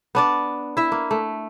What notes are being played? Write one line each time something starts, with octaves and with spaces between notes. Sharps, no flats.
B3 D4 D5
E4 E5
A#3
A3